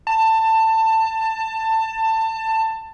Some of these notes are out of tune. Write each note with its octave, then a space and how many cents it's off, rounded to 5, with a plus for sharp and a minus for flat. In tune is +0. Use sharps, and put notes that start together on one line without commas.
A5 +20